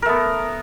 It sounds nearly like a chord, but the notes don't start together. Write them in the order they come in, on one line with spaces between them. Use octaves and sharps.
A#4 A3 B3